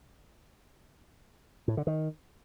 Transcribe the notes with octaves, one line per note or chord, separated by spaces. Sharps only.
A2
D3
D#3